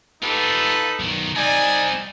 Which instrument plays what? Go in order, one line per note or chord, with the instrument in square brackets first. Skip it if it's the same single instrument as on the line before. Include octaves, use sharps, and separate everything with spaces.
[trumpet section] D#4 A4 B4 [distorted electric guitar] F4 G4
[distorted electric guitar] B1 D#3
[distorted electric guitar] G3 C4 [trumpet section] D#4 D5 G#5